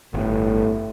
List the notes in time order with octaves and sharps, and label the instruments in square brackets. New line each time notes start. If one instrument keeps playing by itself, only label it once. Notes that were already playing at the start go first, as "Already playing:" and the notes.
[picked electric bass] G1 [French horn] A2